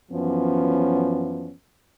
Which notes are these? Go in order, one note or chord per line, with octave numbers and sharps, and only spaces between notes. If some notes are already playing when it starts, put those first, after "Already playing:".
F#2 E3 F3 B3 C#4